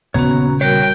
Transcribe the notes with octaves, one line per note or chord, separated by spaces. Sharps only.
D#1 C#3 A#3 B3 C#4 F#4 C#5 A#5
G3 F#4 A#4 C#5 G5